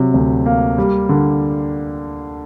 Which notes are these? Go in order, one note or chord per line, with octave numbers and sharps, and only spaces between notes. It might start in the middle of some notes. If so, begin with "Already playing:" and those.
Already playing: C3 F#3
D2
A#3
G3
D3